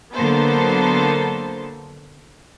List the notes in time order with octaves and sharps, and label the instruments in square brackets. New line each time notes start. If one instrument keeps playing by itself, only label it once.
[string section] D3 F#3 A#3 B3 A4 C5